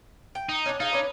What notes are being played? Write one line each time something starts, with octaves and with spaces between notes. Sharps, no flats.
G5
D#4
C#4 D4
D#4 F4 G#4
C#4 D4 B4